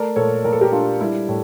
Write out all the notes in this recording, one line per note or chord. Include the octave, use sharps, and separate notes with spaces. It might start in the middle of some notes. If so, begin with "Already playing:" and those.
Already playing: A3 A#4 D5
A#2 A4 C#5
A#2 A#4
A4
G4 A#4
D4 F4
G3 E4
A2